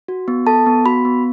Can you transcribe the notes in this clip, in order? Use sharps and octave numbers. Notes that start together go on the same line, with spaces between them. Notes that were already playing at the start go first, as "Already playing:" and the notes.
F#4
B3
A4 A5
B3
F#4 B5
B3